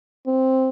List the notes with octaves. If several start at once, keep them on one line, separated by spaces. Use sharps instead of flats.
C4